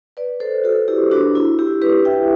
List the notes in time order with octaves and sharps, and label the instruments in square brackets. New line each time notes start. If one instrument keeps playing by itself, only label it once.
[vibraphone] B4 D5
A4 C5
F#4 A4
E4 G4
D4 F#4
E4
E4 G4
G4 B4
E5 G5